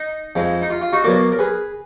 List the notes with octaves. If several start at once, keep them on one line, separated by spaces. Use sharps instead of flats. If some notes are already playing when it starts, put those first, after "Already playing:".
Already playing: D#4
F2 F3 G#3
D#4
F4
F4
D#4 F#4
B2 F#3 A#3 A#4 D5
A#4
G#4 B4